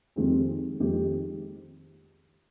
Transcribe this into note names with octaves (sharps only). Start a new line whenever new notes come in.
F2 D#3 G#3 C4 G4
F2 D#3 G#3 C4 G4